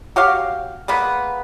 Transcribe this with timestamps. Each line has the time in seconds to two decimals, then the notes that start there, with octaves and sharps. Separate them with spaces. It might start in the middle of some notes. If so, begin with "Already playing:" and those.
0.16 F#4 G4 C#5 F5
0.88 G#3 A#3 B3 B4